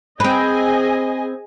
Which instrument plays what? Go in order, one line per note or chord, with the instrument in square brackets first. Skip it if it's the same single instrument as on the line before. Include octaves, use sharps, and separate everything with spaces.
[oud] C4 B4 [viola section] G#4 D#5 G#5